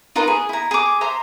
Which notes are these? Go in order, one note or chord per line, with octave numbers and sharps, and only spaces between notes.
D#4 F4 A#4 B4
G#4
E4 A#5
G#4 D6
C5 E5 A#5 C6